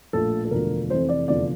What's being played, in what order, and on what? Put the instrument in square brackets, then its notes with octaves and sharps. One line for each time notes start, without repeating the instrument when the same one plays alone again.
[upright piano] A#1 A2 F3 A4
A4
E1 D2 D3 F3 A#4
F1 F2 C3 E3 C5
D5
F1 E2 D3 F3 D5